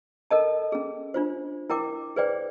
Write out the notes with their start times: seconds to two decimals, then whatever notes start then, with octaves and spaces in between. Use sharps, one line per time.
0.31 A4 A#4 D#5 A5
0.72 C#4 G#4
1.14 D4 F4 C5
1.70 E4 A#4 G5 D6
2.16 G#4 B4 C5 D5 G5